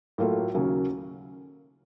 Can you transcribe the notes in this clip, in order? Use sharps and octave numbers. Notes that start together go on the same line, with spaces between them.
A2 F#3 A#3 F4 A4
D#2 C#3 F#3 A#3 C#4